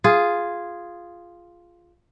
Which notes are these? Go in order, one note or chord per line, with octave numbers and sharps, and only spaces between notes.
F4 G#4